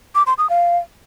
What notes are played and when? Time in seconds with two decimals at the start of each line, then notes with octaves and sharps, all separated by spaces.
0.15 D6
0.27 C6
0.38 D#6
0.50 F5